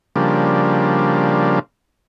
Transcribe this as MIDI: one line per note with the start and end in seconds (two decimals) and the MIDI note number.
0.16 1.59 49
0.16 1.59 53
0.16 1.59 55
0.16 1.59 58
0.16 1.59 62